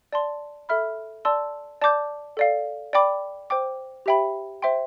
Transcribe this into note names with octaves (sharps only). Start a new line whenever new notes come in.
D5 A5 C6
A4 E5 B5 F6
D5 A5 C6 E6
D5 A5 D6 G6
A4 D5 F5
D5 G5 B5 D6
C5 G5 D6
G4 C5 E5 G5 B5
C5 E5 G5 C6